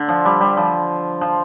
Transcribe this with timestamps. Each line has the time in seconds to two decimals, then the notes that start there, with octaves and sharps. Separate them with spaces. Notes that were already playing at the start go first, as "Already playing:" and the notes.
Already playing: D3
0.08 F3
0.25 G3
0.41 G3
0.57 F3
1.21 F3